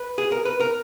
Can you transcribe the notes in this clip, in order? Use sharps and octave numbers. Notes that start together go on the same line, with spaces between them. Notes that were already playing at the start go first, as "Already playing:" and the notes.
Already playing: B4
G#4
A#4
B4
A#4